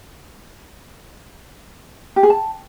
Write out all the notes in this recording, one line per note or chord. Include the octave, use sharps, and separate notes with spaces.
G4
G#4
A5